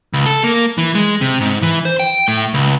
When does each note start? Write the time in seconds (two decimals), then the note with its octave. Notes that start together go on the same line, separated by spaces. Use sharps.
0.13 C#2
0.26 A4
0.44 A#3
0.78 E3
0.95 G#3
1.21 C3
1.41 G#2
1.62 E3
1.85 C5
1.99 G5
2.28 A2
2.54 C#2